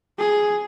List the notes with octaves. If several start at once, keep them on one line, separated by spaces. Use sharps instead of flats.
G#4